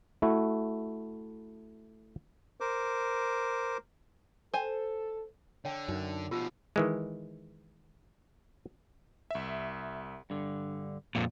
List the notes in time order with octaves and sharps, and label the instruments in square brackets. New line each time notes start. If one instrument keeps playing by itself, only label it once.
[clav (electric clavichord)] A3 E4 F#4
[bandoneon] A#4 C5 D6
[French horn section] A4 [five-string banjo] C5 G#5
[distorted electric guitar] D3 [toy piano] C#5 G5
[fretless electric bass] F#2 [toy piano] D#4
[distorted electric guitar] B2 F3 [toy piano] F4 G4 E6
[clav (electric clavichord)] D#3 E3 G#3
[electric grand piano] C2 E5
[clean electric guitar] G2 D3
[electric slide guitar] F2 A#2